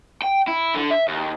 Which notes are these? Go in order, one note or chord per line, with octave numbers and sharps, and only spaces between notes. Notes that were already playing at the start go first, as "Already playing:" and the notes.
G5
E4
D3
E5
D#2